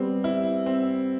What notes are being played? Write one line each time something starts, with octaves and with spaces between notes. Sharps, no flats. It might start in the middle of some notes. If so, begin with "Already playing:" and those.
Already playing: G3 B3 C4
E4
C4